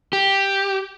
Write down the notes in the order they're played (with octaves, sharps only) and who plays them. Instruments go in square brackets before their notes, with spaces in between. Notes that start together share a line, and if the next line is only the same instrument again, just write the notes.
[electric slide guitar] G4